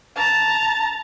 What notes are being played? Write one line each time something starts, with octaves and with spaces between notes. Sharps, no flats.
A5 A#5